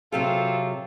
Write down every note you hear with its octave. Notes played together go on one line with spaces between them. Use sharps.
C3 F#3 C4 F4 G#4 A4